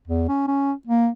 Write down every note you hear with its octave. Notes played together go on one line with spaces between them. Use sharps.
E2
C#4
C#4
A#3